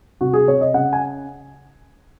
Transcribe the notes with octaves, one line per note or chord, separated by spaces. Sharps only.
C3 F#4
G#4
C3 C#5
D#5
C#3 F#5
G#5